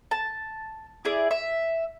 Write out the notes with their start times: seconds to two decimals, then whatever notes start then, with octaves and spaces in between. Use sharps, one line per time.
0.11 A5
1.05 E4 G#4 D5
1.31 E5